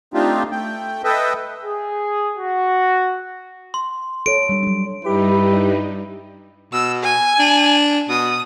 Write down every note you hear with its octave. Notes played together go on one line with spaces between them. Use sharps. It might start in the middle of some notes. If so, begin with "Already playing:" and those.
A3 C4 D4 D#4 F4 G4
A3 G5
A4 B4 D#5 E5 G5
G#4
F#4
C6
A4 C#5 D7
G3 D4
F#3 D4
G2 G3 D#4 E4 G4 B4
B2 E6
G#5
D4
B2 D#6